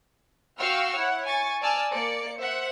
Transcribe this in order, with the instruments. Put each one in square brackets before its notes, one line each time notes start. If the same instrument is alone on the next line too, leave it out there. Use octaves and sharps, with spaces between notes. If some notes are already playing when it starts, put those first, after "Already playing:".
[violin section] F#4 F5 G5 C#6 E6 F6
E4 C#5 F#5
G#5 C#6 A6
D5 G#5 A5 E6 F6
A#3 D5 C#7
C5 E5 F#5